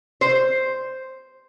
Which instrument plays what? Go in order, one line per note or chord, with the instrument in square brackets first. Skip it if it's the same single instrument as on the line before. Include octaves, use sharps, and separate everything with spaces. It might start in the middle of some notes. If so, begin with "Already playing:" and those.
[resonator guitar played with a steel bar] C5